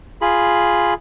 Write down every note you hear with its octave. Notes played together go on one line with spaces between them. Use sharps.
F4 G#4 B5